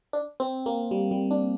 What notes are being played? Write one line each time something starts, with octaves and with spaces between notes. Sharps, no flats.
D4
C4
A#3
G3
G3
D4